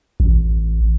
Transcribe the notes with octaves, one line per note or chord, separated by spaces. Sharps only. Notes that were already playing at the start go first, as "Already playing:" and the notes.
A1